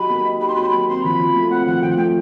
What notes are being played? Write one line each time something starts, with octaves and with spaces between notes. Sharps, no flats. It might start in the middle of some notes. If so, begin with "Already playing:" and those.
Already playing: F#3 D#4 G4 B5
A#3
D#4
G4 B5
C6
F#3 B5
C6
A#3 B5
C4 C6
F3 B5
F3
A3
C4 F#5
F3 F#5
F3 G5
F#5
A3 G5